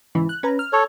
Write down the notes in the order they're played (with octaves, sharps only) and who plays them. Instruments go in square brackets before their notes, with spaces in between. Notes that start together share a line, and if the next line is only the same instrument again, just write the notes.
[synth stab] G#2 C#3 E3
F#6
C#4 B4 A#5
F6
[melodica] A4 C#5